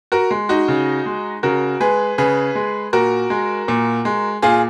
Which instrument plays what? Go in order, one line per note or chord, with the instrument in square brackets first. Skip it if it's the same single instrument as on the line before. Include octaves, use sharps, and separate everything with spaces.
[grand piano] F#4 A#4
G#3
D#4 F#4
C#3
G#3
C#3 F#4 A#4
G#3 G#4 B4
C#3 G#4 B4
G#3
A#2 F#4 A#4
G#3
A#2
G#3
A#2 F4 G#4